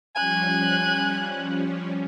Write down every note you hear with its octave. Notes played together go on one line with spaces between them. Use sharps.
F3 G3 C#4 G#5 F#6